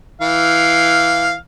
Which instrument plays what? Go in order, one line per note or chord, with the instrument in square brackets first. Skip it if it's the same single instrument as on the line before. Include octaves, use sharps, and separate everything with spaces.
[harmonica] E3 F5